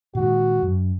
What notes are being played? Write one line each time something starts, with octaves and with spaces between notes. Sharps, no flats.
A#2 D#3 G#3 F#4
F#2